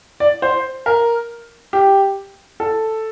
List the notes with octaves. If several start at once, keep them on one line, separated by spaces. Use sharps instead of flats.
D5
C5
A#4
G4
A4